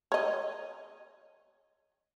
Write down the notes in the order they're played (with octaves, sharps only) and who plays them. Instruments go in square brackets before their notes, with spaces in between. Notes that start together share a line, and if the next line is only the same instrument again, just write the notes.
[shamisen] C#5 D#5